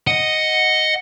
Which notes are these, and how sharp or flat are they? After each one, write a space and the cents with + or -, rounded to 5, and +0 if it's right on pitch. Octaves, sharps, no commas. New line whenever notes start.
D#5 +0 F#5 +0